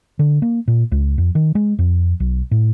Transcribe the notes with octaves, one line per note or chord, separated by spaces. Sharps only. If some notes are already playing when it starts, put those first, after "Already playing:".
D3
A#3
A#2
C#2
F2
D#3
G#3
F2
B1
A2